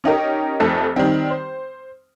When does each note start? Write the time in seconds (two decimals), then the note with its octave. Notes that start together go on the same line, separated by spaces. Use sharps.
0.04 C#4 D#4 G4 A#4
0.60 F1 F2 A3 A5 C#7
0.96 D#3 G3 C4
1.30 C5